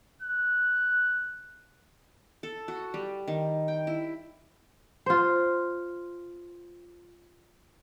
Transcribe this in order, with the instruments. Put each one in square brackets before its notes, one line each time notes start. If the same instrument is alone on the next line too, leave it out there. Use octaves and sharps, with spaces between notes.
[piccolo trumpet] F#6
[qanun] A4
F#4
G3
D#3
G5
E4
[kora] F4 C5